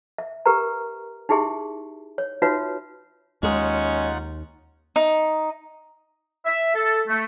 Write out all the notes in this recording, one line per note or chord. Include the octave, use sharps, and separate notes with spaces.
E5
G4 A#4 B4 A#5
D#4 E4 G4 G#4 E5 C6
C#5
D#4 F4 F#4 B4 C#5 E5
D#2 G#3 C#4 D#4 F4 F#5
D#4
E5
A4
A3